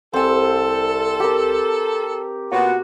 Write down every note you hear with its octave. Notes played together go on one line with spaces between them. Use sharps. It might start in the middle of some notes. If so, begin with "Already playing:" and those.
C2 C4 A4 G#5
G4 A#4
A#2 B3 F#4